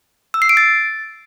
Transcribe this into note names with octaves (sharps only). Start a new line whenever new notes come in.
E6
C7
D7
A6